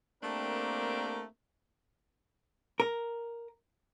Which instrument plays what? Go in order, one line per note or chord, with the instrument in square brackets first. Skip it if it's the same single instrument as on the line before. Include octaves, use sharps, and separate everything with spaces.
[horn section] A3 A#3 C4 D4 G4 A#4
[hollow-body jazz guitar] A#4